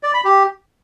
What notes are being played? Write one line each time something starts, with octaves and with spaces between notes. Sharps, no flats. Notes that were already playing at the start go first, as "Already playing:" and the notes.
D5
B5
G4